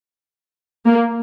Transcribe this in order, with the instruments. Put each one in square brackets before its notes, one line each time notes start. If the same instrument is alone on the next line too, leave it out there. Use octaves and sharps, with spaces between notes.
[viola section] A#3